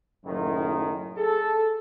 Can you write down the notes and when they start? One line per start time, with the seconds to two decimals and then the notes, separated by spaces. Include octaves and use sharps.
0.25 F#1 F#2 A2 D#3
1.17 G#4 A4